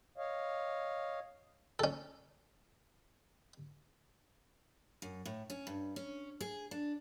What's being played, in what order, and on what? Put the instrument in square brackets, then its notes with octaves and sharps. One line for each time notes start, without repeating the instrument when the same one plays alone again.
[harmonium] C#5 D#5 F5
[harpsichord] C#4 A4
[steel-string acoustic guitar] F#2
A2
C#4
G2
C#4
G#4
D4